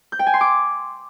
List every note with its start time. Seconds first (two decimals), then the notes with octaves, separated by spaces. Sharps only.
0.12 G6
0.19 G5
0.26 G#5
0.34 C6
0.41 D6